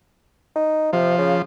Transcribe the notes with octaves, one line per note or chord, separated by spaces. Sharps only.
D#4
C3 F3
C#3